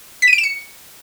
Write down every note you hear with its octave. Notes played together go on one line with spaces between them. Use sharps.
B6
D#7
D7
E7
C#7